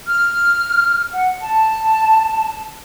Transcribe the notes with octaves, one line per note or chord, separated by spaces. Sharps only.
F6
F#5
A5